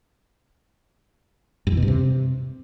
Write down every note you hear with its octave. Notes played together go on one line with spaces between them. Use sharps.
G2
E2
B2
G2
C3